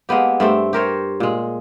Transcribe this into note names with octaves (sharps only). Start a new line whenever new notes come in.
G#3 A#3 B3 G4
G2 A3 C4
G4 A#4 C5 C#5
A#2 G#3